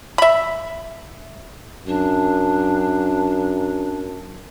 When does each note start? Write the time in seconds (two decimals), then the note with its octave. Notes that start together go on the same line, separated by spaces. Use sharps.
0.18 E5 B5
1.87 F#2 D4